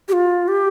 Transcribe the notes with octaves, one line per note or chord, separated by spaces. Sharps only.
G4
F4
G4